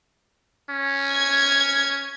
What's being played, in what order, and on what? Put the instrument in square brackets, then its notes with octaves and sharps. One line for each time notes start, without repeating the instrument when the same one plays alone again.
[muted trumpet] C#4
[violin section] G#6